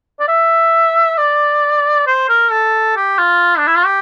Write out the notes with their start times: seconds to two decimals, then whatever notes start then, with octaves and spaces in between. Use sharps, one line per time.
0.20 D5
0.28 E5
1.18 D5
2.07 C5
2.29 A#4
2.52 A4
2.96 G4
3.19 F4
3.58 D4
3.67 E4
3.77 F4
3.86 G4